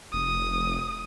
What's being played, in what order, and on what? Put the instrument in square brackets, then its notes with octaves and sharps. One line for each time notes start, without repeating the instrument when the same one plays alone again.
[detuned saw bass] F1 [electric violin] D#6